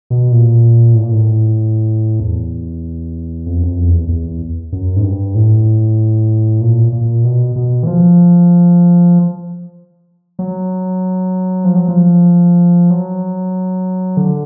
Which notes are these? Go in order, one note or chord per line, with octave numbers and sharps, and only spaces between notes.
B2
A#2
A2
A#2
A2
E2
F2
F#2
F2
E2
E2
F#2
G#2
G2
A2
A#2
A#2
B2
B2
E3
F3
F#3
F3
F#3
F3
F#3
D3